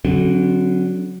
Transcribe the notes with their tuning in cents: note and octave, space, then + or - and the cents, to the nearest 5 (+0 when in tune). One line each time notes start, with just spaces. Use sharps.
D3 -25 F#3 -5 C4 +35